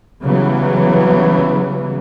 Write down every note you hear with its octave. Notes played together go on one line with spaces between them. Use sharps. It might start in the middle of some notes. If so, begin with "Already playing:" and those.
C#3 E3 F#3 G3 B3